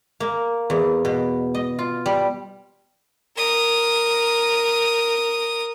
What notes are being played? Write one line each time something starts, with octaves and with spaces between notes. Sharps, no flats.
A#3
E2
B2
D#5
F4
G3
A#4 D#6